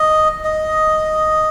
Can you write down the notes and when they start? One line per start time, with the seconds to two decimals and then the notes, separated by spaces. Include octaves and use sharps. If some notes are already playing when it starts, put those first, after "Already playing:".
Already playing: D#5
0.45 D#5